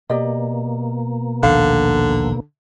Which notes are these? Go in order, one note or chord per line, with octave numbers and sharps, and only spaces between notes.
B2 A#3 G4 D5 D#5
A#1 D#2 D3 F5